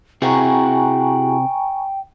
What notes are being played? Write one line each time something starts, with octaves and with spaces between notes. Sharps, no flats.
C3 E4 F#4 G#4 G5 G#5 A#5 C#6